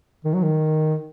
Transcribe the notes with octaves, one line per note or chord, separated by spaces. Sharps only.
D#3
F#3
D#3